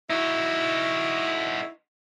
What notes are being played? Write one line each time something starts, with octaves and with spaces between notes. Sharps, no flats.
D#4 E4 F#4